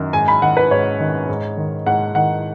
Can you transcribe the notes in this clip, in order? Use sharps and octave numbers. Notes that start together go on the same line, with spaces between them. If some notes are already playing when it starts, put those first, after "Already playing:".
Already playing: F#2 D#3
G#2 G#5
B5
D#3 F#5
B4
G#2 C#5
D#3
G#2
D#3
G#2 F#5
D#3 F#5